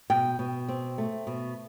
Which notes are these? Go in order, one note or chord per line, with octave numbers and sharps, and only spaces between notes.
B2 G5
B2
C4
A3
B2